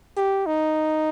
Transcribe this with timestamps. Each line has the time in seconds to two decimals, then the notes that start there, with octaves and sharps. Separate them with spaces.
0.17 G4
0.46 D#4